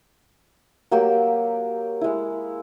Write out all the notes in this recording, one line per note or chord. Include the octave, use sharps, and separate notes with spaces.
F#3 A#3 G4 E6
G#3 E4